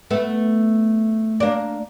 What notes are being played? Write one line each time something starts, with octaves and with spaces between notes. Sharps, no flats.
A3 B3
A#3 D4